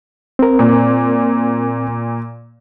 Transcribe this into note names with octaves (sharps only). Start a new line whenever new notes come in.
C4 A#4
A#2